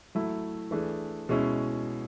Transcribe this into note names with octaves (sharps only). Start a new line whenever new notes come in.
F#3 A3 E4
E3 A3 D4 G#4
B2 G#3 C#4 E4